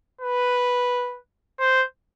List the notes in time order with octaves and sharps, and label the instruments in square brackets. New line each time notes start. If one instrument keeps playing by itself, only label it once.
[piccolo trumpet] B4
C5